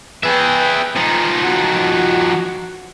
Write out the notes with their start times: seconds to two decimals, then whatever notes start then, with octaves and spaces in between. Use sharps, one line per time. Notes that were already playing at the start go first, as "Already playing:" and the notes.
0.23 G#4 B4 E5 G5
0.95 F3 D#4
1.43 F#4